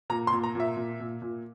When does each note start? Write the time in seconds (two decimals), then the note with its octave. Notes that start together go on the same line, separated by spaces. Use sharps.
0.10 A#2 A#5
0.27 C6
0.32 A#2
0.43 A#5
0.55 A#2 E5
0.77 A#2
1.00 A#2
1.22 A#2